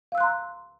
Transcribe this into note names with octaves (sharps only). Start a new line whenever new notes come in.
F5 A#5 C6 E6 F#6